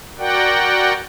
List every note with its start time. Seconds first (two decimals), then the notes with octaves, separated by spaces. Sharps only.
0.18 F#4 A#4 D5 F#5 G5